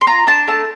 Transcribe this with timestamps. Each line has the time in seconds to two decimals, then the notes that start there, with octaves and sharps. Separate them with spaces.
0.01 C6
0.07 F4 A#5
0.27 D4 A5
0.48 A3 A5